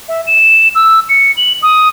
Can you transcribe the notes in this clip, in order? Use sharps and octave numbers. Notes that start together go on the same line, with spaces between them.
E5
E7
E6
C#7
F#7
D#6